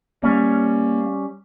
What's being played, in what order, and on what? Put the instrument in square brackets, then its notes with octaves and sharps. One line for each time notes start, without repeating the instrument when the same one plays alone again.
[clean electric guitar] G3 C#4 [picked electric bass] A#3